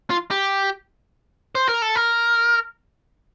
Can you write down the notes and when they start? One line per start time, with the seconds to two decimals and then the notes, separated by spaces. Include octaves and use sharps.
0.10 F4
0.31 G4
1.55 C5
1.69 A#4
1.82 A4
1.95 A#4